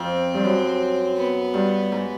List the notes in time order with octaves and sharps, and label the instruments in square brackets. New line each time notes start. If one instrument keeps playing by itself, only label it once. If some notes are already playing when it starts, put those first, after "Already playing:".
Already playing: [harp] F2 [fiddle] C4
[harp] G2
F#2
[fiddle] B3
[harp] G2
G#2